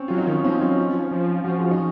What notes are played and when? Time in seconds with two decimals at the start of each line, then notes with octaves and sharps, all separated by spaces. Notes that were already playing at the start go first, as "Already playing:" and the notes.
Already playing: C4 C#4
0.08 F#3 F4
0.18 D#4
0.27 D#3 C#4
0.44 F3 C4 D#4
0.61 F#3 C#4 F4
0.78 F3
1.11 F3
1.44 F3 F#4
1.58 G#4
1.71 D#4 F#4